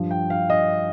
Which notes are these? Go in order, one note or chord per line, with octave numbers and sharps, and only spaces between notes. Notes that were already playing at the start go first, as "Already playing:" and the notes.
Already playing: G2 F3
G5
F5
D#5